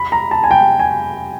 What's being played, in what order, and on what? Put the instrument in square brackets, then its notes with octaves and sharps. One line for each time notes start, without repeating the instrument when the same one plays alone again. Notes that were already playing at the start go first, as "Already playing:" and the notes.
Already playing: [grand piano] B5
A#5
A5
G#5
G5
G#5